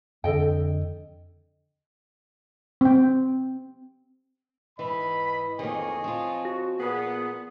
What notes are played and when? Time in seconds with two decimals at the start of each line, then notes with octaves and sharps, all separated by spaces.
0.24 F2 D3 A4 D#5 G5
2.81 C4 G5
4.79 G#2 E3 D#5 B5
5.59 F2 D#3 A#3 G#4 C#5 D#5
6.04 F3 C4 F4
6.45 F#4
6.80 A#2 B3 G#4